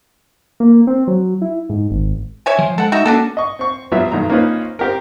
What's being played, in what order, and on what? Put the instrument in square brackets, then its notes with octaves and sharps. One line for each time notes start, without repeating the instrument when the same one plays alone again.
[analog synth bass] A#3
C4
F#3
E4
G#2
G#1
[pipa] C#5 E5 G#5
[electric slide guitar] F3 C5
[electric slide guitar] G#3 [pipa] A4 F#5
[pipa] D#4 F#4 E5
[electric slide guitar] A#3 C#4 [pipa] D4 F#4 A4
[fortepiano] D#5 C#6
C4 C#6
E3 F#3 G3 B3 F4 E5
B1 G2 D#3 A#5
A#3 C4 C#4 D#4 F4 B4
C4 G4 A#4